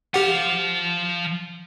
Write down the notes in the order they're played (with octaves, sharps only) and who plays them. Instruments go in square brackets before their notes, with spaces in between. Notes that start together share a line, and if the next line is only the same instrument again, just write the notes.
[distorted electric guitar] F3 F5 [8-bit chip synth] G4 F#5